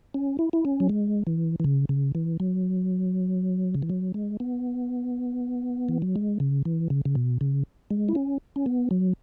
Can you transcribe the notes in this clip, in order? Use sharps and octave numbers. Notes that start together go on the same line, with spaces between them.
C#4
E4
E4
C#4
F#3
G#3
E3
E3
C#3
C#3
E3
F#3
C#3
E3
F#3
G#3
B3
E3
F#3
G#3
C#3
E3
C#3
C#3
B2
C#3
G#3
E4
C#4
C#4
B3
F#3